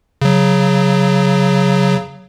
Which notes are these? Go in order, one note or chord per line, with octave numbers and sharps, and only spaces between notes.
C#3 F#3